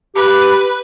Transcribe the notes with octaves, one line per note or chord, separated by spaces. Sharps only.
G4 B4